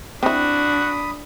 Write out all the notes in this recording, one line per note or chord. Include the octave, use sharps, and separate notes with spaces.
C4 D4 E4 F#4 B5 D#6